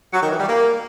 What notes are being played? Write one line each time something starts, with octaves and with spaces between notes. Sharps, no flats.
F#3
D#3
E3
G3
A#3